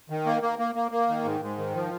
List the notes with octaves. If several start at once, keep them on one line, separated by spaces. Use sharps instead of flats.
D#3
A#3
A#3
A#3
A#3
A#3
D#3
G#2
G#2
D#3
F3